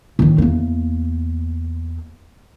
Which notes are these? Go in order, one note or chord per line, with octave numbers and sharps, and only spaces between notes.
A2 D#3
E2 A#3